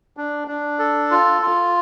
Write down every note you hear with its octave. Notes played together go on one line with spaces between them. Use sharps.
D4
D4
A4
F4
F4